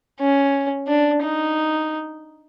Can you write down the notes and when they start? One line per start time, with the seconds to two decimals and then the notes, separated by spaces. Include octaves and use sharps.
0.20 C#4
0.88 D4
1.23 D#4